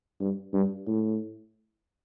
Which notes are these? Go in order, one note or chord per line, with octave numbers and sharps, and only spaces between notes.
G2
G2
A2